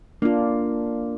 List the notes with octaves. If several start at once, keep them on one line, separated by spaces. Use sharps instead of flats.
A#3 D4 F4